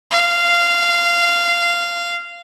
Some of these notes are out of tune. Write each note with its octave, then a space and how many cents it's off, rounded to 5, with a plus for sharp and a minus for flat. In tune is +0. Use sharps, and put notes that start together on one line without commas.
F5 -15